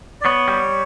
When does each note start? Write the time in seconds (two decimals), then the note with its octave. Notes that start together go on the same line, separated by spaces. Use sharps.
0.21 D5
0.24 B3 C#5
0.48 G3